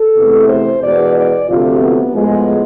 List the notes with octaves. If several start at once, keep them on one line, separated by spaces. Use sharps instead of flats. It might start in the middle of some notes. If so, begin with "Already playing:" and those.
Already playing: A4
E2 C3 E3 A3
C5
E2 B2 G#3 B3 D5
D5
D2 C3 F3 A3 F4
B3
A2 F3 G#3 B3